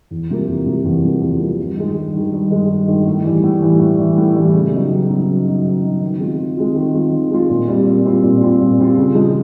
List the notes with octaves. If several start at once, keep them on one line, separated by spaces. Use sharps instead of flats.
E2
C3 F3 A#3
E2
C3 F3 A#3
E2
C3 F3 A#3
E2
C3 F3 A#3
G2
D#3 G#3
G2
D#3 G#3
G2
D#3 G#3
G2
D#3 G#3
A2
E3 G3
A2
E3 G3
A2
E3 G3
A2
E3 G3
C#3
F#3 B3 D#4
C#3
F#3 B3 D#4
C#3
F#3 B3 D#4
C#3
F#3 B3 D#4
D#3
G#3 C4 F4
D#3
G#3 C4 F4
D#3
G#3 C4 F4
D#3
G#3 C4 F4
A#2
G3 C4 F4
A#2
G3 C4 F4
A#2
G3 C4 F4
A#2
G3 C4 F4
C#3
F3 G#3